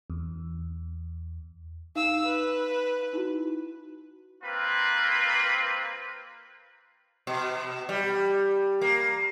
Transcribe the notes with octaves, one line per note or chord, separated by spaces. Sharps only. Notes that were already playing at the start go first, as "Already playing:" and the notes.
E2
D#4 F5 E6
B4
D#4 E4 F#4
A#3 C4 F4 B4
B2
G3
A#3